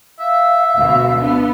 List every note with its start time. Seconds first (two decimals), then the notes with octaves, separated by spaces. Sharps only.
0.20 E5 F5
0.76 D2 B2
1.20 B3 D4